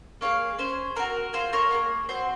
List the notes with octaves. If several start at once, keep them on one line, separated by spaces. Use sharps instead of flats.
A#3 F4 G#4 C#5 F5
C#4 G#4 C5
C4 D#4 F#4 A#4
C4 F4 G#4 C5
A#4 C#5
A#3 F4 G#4
C4 F#4 C5